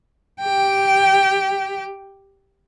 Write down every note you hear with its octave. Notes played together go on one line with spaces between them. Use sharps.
G4 G5